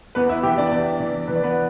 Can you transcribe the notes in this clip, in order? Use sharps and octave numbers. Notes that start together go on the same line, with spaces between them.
E2 B3 B4
E4 E5
E3 G4 G5
D4 D5
E2
E3
E3 B4
D5
B3 B4